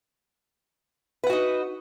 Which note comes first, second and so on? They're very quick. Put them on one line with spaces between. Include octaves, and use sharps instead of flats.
B4 F#5 F#4 D#4